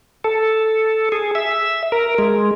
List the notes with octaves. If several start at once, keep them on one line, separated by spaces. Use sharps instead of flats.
A4
G#4
E5
A#4
G#3